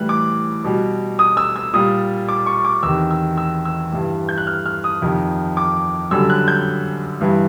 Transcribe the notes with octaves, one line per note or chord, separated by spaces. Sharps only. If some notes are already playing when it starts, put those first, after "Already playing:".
Already playing: A2 E3 G3 F#6
D6
B2 G3
D#6
E6
E6
A#2 G3 D#6
D6
C#6
D6
E2 C3 D#3 E6
E6
E6
E6
G2 E3 G3
G6
F#6
F6
F6
D#6
F2 C3 D#3
D6
F#2 D3 G3 E6
F#6
G6
G2 E3 G3